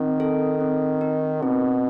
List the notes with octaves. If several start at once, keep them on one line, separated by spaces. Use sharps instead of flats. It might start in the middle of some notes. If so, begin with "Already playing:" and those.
Already playing: D#3 C4
A4
C4
D#4
B2 C4